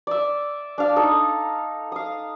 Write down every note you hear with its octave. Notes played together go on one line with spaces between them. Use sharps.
D5 E5
D4 F5
D#4 A4 D#5
F5 D#6